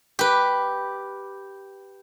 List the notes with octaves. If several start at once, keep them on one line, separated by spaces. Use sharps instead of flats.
G4 B4